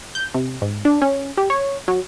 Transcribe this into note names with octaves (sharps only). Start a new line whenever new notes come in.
G6
C3
G#2
D4
C#4
G4
C#5
F#3